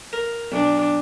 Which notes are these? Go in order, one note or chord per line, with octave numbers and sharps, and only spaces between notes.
A#4
B1 D4